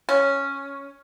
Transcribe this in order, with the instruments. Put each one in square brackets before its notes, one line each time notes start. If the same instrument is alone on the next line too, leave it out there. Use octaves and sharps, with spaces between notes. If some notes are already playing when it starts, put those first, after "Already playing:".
[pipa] C#4